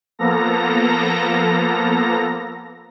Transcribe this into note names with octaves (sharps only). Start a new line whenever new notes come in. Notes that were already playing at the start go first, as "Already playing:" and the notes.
F3 A#3 B3 A4 A#5 A#6